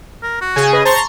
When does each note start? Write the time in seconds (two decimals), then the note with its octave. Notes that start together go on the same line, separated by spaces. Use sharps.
0.23 A#4
0.41 F#4
0.56 C#3 G#4 G#5
0.73 B4 D#5
0.85 C5 A5 A#5 C6 C#6